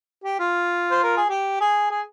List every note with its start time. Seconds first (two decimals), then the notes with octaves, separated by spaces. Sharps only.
0.24 G4
0.39 F4
0.91 C5
1.04 A#4
1.17 G#4
1.29 G4
1.60 G#4
1.90 G#4